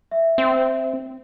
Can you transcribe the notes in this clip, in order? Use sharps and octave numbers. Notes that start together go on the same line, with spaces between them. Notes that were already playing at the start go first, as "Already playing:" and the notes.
E5
C4